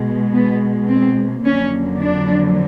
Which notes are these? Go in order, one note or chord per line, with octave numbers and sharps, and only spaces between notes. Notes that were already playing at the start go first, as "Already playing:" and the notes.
Already playing: B2 G#3
B3
C4
F2 D3 F#3 A#3 C#4
D4